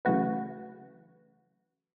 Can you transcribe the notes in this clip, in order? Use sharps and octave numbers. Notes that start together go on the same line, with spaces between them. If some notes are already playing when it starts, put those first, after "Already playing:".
C#3 E3 F#3 A3 F#4 B4